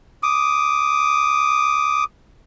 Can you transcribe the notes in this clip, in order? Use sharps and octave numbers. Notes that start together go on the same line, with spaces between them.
D6 D#6